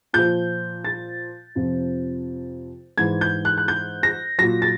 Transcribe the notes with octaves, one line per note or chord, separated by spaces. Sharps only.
A#2 F3 G6
A6
F2 C3 F3
G#2 E3 G#6
G6
F#6
F#6
G6
A#6
A#2 F#3 A#6
A6